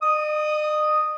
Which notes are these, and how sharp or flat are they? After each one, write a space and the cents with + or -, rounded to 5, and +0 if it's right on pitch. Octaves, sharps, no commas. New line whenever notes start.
D#5 -45 D#6 +0